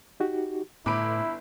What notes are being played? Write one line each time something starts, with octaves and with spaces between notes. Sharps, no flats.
D#4 F#4 G4
G1 A2 E4 B5 D6 D7